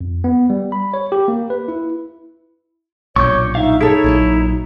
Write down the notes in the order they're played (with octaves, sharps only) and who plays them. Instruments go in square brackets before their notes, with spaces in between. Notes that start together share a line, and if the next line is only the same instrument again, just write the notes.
[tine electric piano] F2
B3
G3
B5
C#5
G4
A#3
B4
E4
[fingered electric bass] B1 G2 A#2 [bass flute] C#5 [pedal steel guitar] C#6 D6 G6
[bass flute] D#4 [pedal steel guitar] E5 F5
[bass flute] D#4 [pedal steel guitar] E4 C#5 [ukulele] G#4 A4
[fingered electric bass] A#1 A#2 F#3